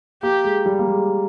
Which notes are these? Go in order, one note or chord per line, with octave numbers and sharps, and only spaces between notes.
A#3 G4
G#3
G3
A#3
G#3